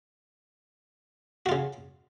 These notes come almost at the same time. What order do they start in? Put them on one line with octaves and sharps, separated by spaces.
F#4 F4 C#3